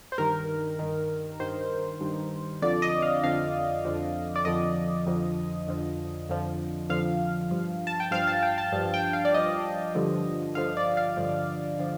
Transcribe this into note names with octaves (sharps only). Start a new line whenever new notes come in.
C5
G2 D#3 A#4
G2 D#3
G2 D#3 C5
G2 D#3
F2 D3 F3 D5
D#5
F5
F2 D3 F3 F5
F2 D3 F3
D5
F2 D3 F3 D#5
F2 D3 F3
F2 D3 F3
F2 D3 F3
F2 D3 F3 F5
G2 F3
A5
G5
G2 F3 F5
A5
G5
A5
G2 F3
G5
F5
D5
G2 F3 D#5
G2 D3 F3
G2 D3 F3 F5
D5
F5
G2 D3 F3
D3 F3